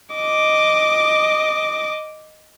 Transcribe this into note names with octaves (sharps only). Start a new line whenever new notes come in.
D#5 D6